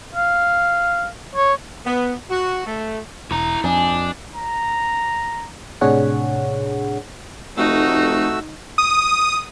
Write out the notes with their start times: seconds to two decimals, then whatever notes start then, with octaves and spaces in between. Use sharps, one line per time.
0.14 F5
1.36 C#5
1.85 B3
2.30 F#4
2.66 A3
3.31 E1 E4 A#5
3.64 F2 D4 D#4 G#5
4.34 A#5
5.81 A2 C3 D4 G#4 C#5 F#5
7.57 F1 A3 D#4 F#4 E6
8.78 D#6